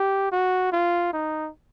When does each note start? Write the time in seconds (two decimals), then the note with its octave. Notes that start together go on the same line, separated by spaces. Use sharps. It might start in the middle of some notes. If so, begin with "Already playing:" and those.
Already playing: G4
0.32 F#4
0.72 F4
1.13 D#4